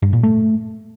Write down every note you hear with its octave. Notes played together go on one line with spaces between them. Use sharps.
G2
A#2
A3